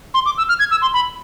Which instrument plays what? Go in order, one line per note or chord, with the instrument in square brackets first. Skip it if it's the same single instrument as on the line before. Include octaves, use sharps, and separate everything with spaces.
[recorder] C6
D6
E6
F6
G#6
E6
C6
B5